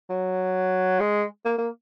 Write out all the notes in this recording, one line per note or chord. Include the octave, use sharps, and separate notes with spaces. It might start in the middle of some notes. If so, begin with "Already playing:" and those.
F#3
G#3
A#3
A#3